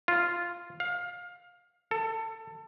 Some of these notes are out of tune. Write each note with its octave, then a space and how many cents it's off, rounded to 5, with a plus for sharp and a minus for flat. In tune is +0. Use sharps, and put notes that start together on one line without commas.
F4 -5
F5 +20
A4 +25